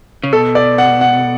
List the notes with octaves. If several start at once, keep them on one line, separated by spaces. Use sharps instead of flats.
C#3
B2 A4
D5
F#5
F#5